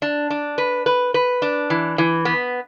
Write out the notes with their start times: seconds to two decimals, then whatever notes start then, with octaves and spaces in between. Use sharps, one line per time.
0.02 D4
0.30 D4
0.58 B4
0.86 B4
1.14 B4
1.42 D4
1.70 E3
1.98 E3
2.25 B3